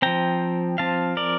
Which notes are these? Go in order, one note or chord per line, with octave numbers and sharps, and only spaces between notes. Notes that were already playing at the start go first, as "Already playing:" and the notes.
F3 C4 G5 A#5
F3 C4 F5 A5
A#4 D5